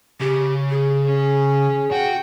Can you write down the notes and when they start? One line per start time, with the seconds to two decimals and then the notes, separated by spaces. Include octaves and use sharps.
0.20 C#3 G4
0.70 G#4
1.05 C#4
1.92 F#4 G5